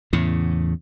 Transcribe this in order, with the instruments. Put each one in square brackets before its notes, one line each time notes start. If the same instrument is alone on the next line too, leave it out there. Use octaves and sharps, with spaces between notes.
[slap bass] E2 A2 C#3